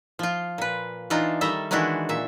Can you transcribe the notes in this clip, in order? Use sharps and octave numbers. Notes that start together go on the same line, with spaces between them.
F3 F4
A#2 B4
E3 D4 D#4 F4
D#3 G3 A4 E5 A#5
D#3 E3 G#3 D4 E4 F#4
A#2 E5